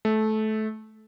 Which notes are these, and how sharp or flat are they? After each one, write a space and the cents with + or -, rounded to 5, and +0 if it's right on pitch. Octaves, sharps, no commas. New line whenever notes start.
A3 -20